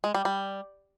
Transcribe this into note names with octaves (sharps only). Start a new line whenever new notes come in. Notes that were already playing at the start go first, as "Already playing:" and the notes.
G#3
G3
G3